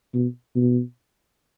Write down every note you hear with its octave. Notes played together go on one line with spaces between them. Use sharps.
B2
B2